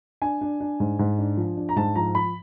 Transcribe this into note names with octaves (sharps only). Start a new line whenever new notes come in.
D4 G#5
D4
D4
G#2
G#2
D4
F3
D4
A#5
G#2 A5
F3 A#5
F3 B5